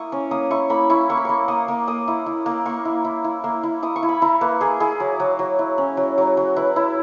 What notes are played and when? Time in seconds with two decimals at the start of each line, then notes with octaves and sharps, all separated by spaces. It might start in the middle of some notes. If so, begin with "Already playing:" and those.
Already playing: A#3 E4 C#6 D#6
0.12 C#4
0.31 A#3 D#6
0.51 E4 C#6
0.70 A#3 B5
0.90 E4 C#6
1.09 A#3 C#6
1.17 B5
1.25 A#3 C#6
1.48 A#3 D#6
1.68 A#3
1.87 A#3 D#6
2.08 E4
2.26 E4
2.46 A#3
2.65 A#3 C#6
2.85 E4
3.05 E4
3.24 E4
3.44 A#3
3.63 E4
3.83 E4 D#6
3.96 C#6
4.03 E4
4.09 B5
4.22 E4 A#5
4.41 A#3 B4
4.61 A#3 G#4
4.80 E4 G#4
5.00 F#3
5.20 F#3
5.39 F#3
5.59 E4
5.78 C#4
5.97 F#3
6.18 F#3
6.37 F#3
6.56 E4 B4
6.76 E4